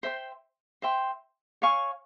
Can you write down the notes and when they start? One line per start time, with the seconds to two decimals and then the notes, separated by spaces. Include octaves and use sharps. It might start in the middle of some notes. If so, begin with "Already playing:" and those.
0.03 C5 E5 G5 C6
0.82 C5 E5 G5 C6
1.62 C#5 F5 G#5 C#6